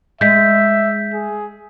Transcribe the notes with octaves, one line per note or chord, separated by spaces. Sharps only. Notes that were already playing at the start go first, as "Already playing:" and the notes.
G#3 E5 G6 B6
G#4